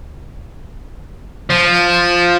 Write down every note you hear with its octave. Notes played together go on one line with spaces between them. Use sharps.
F3